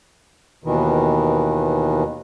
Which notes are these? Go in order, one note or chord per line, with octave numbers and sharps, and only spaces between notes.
D#2 B2 D#3 E3